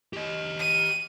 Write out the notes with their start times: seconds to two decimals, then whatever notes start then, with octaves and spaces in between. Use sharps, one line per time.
0.13 G4 D#5
0.59 D#7